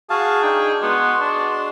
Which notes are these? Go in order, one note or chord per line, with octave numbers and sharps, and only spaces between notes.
F#4 G#4 F5 A5
D4 D#4 G5
G#3 B3 F#4 C6
D4